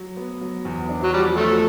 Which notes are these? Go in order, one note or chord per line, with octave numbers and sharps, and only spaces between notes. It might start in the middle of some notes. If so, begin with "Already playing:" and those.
Already playing: F#3
B3
F#3
E2
D4
F#3
F3 G3
F3 F#3 A3